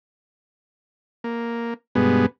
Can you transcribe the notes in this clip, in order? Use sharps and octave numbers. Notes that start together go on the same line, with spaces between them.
A#3
G2 B2 G#3 B3